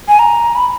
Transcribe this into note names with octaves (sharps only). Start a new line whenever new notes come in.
G#5
A#5
B5